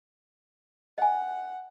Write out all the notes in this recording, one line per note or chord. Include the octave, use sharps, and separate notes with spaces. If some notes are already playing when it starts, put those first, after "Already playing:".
D#5 F#5 G#5